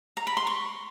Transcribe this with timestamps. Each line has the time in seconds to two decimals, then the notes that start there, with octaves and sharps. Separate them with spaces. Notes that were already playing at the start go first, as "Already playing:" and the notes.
0.17 A#5
0.27 B5
0.37 C6
0.47 C#6